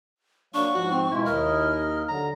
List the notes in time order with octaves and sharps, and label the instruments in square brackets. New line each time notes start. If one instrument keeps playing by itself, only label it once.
[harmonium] F#3 A#3 [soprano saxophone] D4 [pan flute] C#6
[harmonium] G#2 F3 [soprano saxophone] F#4
[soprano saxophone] C4
[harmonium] B2 G#3 F4 [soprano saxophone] E4
[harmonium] D#2 A#4 D#5 [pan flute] F6
[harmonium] D3 F#3 [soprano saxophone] A#5